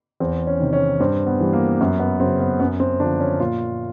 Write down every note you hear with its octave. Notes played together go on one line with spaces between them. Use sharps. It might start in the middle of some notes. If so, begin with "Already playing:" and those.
E2 C4
C#4
C3 D#3
C#4
G2 C4
B3
E3 G3
A#3
F#2 B3
B3
C#3 F#3 C4
B3
F#2 B3
C4
D3 F3 D4
C#4
A#2 F4